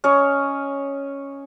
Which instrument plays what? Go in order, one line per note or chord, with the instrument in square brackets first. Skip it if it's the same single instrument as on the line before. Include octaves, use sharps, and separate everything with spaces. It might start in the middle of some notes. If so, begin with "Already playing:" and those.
[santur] C#4 C#5 D#5